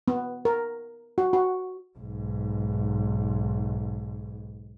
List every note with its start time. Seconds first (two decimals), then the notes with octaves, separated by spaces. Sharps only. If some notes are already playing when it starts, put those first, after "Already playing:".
0.08 B3
0.45 A#4
1.18 F#4
1.33 F#4
1.99 B1 G#2